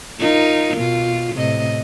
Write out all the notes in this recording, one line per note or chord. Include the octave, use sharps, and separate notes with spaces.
D#4 F4 A#4
B2 F4
A2 C3 D#5